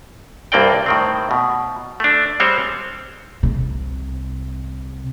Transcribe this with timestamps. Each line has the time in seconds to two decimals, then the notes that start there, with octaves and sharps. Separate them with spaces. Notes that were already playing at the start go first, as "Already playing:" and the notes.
0.52 C2 G2 A#3 C4 D5 G5
0.86 A2 D#3 C4
1.31 B2
2.00 A3 D4
2.40 G3 G#3 C4 C5 C#5
3.43 C2 C3